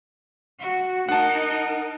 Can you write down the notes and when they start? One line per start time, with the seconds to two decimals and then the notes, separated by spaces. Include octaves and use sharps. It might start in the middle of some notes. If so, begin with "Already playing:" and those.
0.60 F#4
1.09 D#4 A#4 F#5 A5